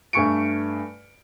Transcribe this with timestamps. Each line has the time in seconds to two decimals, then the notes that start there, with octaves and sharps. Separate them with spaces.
0.13 G2 A3 G#5 C#6 C#7 D7